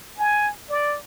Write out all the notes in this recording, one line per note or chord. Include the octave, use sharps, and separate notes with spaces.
G#5
D5